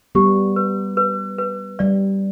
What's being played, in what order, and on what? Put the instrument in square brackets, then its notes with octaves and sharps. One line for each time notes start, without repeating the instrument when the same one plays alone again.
[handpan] G3 B3 [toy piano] G4
[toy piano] B4
B4
B4
[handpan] G3 [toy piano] D5